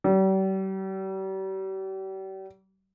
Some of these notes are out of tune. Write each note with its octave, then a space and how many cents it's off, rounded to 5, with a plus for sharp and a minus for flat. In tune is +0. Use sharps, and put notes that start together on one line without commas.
G3 -40